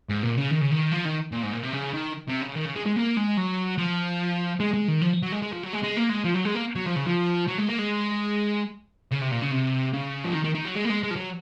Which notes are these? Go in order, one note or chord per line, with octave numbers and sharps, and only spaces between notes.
G#2
A#2
C#3
D#3
C#3
D#3
F3
D#3
A#2
G#2
A#2
C3
C#3
D#3
C3
C#3
D#3
C#3
G#3
G#3
A#3
G#3
F#3
F3
G#3
G#3
D#3
F3
F#3
G#3
G#3
F3
F#3
G#3
G#3
A#3
G#3
F3
F#3
G#3
A#3
F#3
F3
C#3
F3
F#3
G#3
A#3
G#3
C#3
C3
A#2
C#3
C3
C#3
F3
D#3
D#3
D#3
F#3
G#3
A#3
G#3
G#3
F3
F#3